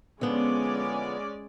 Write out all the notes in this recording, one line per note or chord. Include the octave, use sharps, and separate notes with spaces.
D3 F3 G#3 B3 C#4 D5